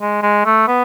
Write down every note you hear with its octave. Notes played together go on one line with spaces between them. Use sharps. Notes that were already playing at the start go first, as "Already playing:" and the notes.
G#3
G#3
A3
B3